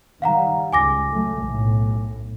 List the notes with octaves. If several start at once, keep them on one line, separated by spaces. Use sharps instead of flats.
D#3 G3 F5 F#5 A#5
C#2 G#5 D6 A#6
F#3 A3
B1 A2